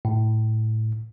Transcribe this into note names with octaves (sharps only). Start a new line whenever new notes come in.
A2